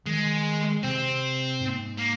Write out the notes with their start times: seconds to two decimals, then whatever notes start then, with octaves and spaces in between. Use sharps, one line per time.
0.06 D#3 G#3
0.83 C3 C4
1.60 G#2
1.98 A#3